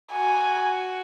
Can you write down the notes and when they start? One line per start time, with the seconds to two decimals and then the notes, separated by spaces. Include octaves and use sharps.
0.13 F#4 G#5